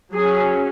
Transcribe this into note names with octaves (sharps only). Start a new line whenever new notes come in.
F#3 C#4 G#4